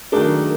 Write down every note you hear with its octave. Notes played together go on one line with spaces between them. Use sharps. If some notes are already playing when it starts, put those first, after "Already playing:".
D#3 F#3 A3 D4 G#4 A#4